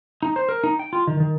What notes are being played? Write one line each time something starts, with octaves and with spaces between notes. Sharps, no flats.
D#4
C5
A#4
D#4
G5
F4
D#3
D#3